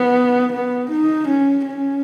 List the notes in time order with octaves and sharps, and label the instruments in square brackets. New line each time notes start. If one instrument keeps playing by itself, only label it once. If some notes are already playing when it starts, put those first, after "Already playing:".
Already playing: [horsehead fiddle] B3
B3
D#4
C#4
C#4